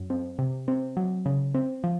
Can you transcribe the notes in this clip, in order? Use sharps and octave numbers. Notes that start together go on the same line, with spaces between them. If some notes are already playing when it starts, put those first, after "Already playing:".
Already playing: F#2
C4
C3
C4
F#3
C#3
C4
F3